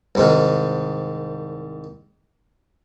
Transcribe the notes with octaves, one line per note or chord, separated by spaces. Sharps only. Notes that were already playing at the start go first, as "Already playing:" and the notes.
C2 G#2 D#3